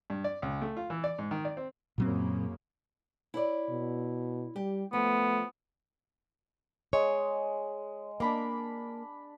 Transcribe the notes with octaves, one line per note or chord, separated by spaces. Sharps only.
G2
D5
C#2
A3
F4
E3
D5
G#2
D#3
D5
C4
F#2 A#2 C#3 F#3 A#3 C4
E4 C#5 D5
B2
G3 G4
F3 A3 B3
G#3 C#5
A#3 D4 B5 D6